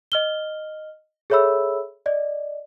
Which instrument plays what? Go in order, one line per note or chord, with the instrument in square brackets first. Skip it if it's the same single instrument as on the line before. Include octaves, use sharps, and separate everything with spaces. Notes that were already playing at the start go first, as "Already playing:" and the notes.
[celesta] D#5 F6 G7
G#4 A4 C#5 E5 B5 E6
D5 D#5